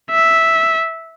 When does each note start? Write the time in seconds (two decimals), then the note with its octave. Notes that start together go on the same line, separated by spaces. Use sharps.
0.11 E5